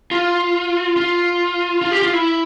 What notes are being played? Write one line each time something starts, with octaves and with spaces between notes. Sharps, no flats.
F4
F4
F4
G4
F4
E4